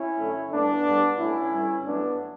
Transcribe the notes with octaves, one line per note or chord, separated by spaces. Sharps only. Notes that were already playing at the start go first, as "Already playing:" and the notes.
Already playing: C#4 E4
F#2 D3 A3
G2 D3 A3 B3 D4
A2 G3
B2 A3 C#4 E4
G2 D3 G3
G2 F#3 A3 B3 D4